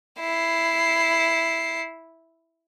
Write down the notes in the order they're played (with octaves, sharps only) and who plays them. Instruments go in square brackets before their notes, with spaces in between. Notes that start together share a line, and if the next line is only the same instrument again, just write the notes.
[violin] E4 C7